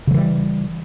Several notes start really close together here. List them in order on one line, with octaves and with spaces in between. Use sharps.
C#3 F#3 E3 G3